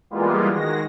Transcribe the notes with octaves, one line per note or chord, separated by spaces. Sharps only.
E3 G3 G#3 A#3 B3 F4
D#3 G#3 F#4 A#6